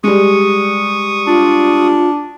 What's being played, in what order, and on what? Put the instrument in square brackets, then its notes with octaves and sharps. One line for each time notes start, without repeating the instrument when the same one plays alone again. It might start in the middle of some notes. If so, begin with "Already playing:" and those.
[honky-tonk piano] G3 G#3 [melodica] C#6 D#6
[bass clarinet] D4 [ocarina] F4